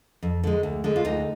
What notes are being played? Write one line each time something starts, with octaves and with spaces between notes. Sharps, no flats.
F2
D3 G#3
D2
D3 G#3
F4
D2 D#4